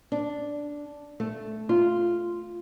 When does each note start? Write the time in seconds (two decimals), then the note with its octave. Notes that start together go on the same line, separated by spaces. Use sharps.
0.12 D4
1.20 A3
1.69 F4